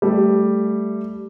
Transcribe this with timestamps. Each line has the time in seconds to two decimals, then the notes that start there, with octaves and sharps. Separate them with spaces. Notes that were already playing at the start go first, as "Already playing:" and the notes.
0.02 G3 A3